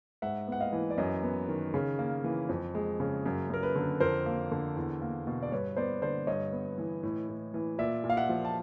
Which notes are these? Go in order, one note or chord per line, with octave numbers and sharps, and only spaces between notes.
G#2 E5 F#5
B3 F#5
D#5 F5
E3
D5
F#2 C#5 D#5
B3
D#3
C#3
A#3
E3
F2
G#3
C#3
F#2
F#2 A#4
B4
D3
F2 A#4 C5
A#3
D3
E2
A#3
B2
D5
G2 B4 C#5
B3 C5 D5
D3 C5 D5
G2 C#5 D#5
B3
E3
A2
A2
E3
A#2 D5 E5
A#2
F5
E5 F#5
F3
A5